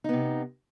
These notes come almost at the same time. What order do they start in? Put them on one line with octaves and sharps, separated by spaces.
D#4 B3 C3